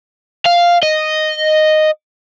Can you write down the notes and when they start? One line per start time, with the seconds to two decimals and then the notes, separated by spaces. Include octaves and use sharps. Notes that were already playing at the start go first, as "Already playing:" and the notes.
0.46 F5
0.83 D#5